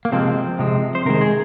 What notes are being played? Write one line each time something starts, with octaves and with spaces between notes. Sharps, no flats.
A#3
C3 F3 G#3 C4
C3 F3 G#3
C5
C3 D#3 G#3 A#4
G#4